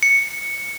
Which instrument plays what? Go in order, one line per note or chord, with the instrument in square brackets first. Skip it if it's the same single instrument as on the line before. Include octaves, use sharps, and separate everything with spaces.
[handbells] C#7